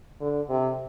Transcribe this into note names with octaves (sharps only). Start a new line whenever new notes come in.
D3
C3